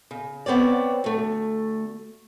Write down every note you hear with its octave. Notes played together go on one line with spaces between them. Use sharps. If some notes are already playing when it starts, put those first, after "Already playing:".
C#3
B3 C4 C#5 D5
D2 A3